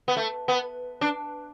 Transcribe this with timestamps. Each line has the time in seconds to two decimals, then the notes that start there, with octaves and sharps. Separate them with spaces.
0.08 B3
0.16 A3
0.48 B3
1.01 D4